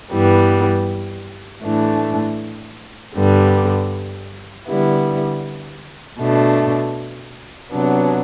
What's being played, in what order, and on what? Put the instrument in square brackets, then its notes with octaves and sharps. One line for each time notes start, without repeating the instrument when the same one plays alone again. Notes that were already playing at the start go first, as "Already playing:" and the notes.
[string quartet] G2 E3 G3 B3
A2 E3 A3 D4
G2 D3 G3 B3
D3 G3 B3 E4
B2 A3 D4
C3 F#3 B3 D4